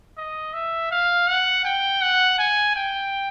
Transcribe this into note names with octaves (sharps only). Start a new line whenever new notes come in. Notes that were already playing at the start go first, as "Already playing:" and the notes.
D#5
E5
F5
F#5
G5
F#5
G#5
G5